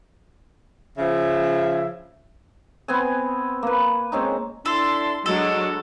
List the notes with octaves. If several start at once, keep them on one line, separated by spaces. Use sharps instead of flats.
C#3 F3 E5
B3 C4 G#5
A#3 B4
G#3 C4 C#4 D#4
D4 E4 A4 C6
F#3 G#3 D4 F#4 A4 D#5